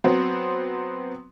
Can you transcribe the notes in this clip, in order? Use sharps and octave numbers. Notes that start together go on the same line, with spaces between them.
F#3 B3 C4